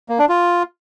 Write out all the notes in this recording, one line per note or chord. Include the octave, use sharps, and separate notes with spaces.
A#3
D4
F4